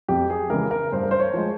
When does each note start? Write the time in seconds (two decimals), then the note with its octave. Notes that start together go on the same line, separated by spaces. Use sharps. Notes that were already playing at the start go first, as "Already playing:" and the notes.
0.08 F2 G4
0.30 G#4
0.50 C#3 E3 G#3 A#4
0.71 A#4
0.93 G2 C5
1.03 A#4
1.11 C5
1.20 C#5
1.33 F3 G#3